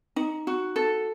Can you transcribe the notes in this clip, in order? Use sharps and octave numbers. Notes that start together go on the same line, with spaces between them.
D#4
F#4
A4